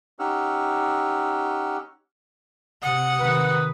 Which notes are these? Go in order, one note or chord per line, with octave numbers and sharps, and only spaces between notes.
C#4 D#4 G4 F#5 E6 F6
C3 F#5 D#6
C3 D#3 B4